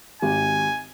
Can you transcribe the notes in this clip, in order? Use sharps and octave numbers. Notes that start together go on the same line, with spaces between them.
G#1 G4 G#5